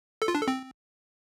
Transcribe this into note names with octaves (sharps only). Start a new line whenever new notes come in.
A4
F4
D4
A4
C4